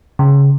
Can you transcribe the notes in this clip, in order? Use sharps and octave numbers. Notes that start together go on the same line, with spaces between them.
C#3